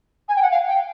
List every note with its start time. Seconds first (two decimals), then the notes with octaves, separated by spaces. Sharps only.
0.29 G#5
0.36 G5
0.42 F#5
0.51 F5
0.68 G5